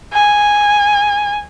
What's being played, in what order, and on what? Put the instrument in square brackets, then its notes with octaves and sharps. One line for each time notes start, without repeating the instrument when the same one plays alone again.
[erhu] G#5